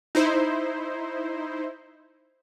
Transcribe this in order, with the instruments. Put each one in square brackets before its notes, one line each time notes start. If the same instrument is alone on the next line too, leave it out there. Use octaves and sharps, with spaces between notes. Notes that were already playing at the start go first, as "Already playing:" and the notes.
[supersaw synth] D#4 E4 C5